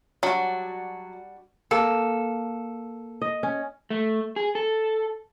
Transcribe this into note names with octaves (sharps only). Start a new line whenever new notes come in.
F#3 G3 D4 F#4
A#3 A4
D#5
C#4
A3
G#4
A4